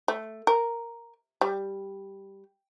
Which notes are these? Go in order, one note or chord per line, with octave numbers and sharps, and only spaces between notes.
A3
A#4
G3